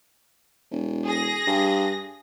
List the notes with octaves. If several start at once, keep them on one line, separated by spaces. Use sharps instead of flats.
E1
G#4 A#6
G2